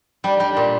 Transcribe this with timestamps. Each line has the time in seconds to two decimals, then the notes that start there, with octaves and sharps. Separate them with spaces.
0.24 G3 D4
0.36 G3 D#4
0.50 D4
0.57 A#2